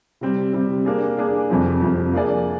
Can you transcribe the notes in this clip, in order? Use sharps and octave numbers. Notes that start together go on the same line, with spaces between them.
C3 G3 C4
C3 G3 C4
A#3 D4 G#4
A#3 D4 G#4
F2 C3 F3 C4
F2 C3 F3 C4
A#3 D4 G#4 D5